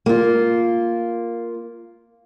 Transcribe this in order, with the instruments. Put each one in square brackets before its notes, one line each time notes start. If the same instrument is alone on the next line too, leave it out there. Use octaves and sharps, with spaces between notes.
[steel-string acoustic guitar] A#3 F4